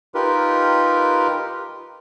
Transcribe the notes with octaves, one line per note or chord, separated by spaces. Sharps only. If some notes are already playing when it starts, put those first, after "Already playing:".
D#4 F4 G4 A#4 B4